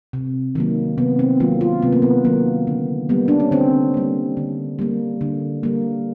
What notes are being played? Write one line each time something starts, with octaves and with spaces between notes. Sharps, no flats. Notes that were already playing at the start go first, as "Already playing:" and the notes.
C3
D#3 F#3 A#3
C3 B3
C4
D#3 F#3 A#3 F4
F4
C3 B3
A#3
B3
D#3 F#3 A#3
D3
G3 A#3 B3
D4
C#4
D3 C4
G3 A#3
D3
G3 A#3
D3
G3 A#3